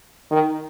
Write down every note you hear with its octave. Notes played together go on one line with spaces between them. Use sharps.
D#3